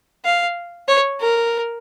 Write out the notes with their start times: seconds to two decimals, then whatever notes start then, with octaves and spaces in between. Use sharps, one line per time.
0.25 F5
0.88 C#5
1.21 A#4